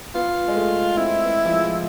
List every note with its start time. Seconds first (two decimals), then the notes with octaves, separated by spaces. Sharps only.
0.15 B3 F4
0.48 G#3
0.56 A3
0.97 C4 E4
1.24 B3
1.46 F3
1.52 G#3